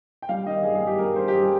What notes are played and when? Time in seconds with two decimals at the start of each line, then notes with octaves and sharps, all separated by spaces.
0.22 G5
0.29 G3 F5
0.46 D#3 D#5
0.63 G2 G#4
0.75 G#4
0.81 G3
0.87 G4
0.98 G2 A#4
1.16 G2 C5
1.28 G4
1.34 G2 G#4